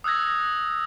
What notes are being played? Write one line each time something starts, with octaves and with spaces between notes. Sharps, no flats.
D#6 E6 F#6 G#6 A#6